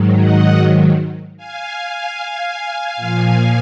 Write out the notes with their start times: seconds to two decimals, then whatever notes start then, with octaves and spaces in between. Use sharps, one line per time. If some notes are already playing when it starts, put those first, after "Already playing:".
Already playing: G#2 D#3 F#3
0.18 D#5 F#5
1.37 F5 G#5
2.97 A#2 F3